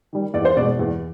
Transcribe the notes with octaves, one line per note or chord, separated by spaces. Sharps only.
D#3 G3
E2 D5
C5
B2 G#3 D5
E2